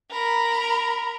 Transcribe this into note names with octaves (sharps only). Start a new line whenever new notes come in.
A#4 B5